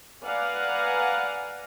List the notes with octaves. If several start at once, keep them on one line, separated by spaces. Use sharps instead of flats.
B4 D5 F5 F#5 G#5 A#5